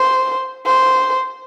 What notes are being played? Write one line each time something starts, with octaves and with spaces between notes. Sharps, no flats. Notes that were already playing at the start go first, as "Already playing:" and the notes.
Already playing: C5
C5